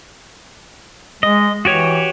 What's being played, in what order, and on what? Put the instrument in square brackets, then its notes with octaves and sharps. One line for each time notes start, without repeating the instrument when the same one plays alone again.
[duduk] G#3 [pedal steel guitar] D#5
[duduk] E3 [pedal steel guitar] F#4 G4 C#5